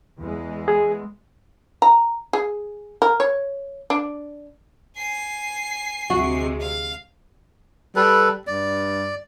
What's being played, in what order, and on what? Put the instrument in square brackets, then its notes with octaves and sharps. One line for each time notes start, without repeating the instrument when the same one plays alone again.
[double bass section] E2 G#3
[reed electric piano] G#4
[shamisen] A#5
G#4
A#4
C#5
D4
[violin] G#5 C7
[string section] D2 C3 G#3 [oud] F#4
[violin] F5
[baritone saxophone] G3 [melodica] A4 B4
[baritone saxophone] G2 [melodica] D5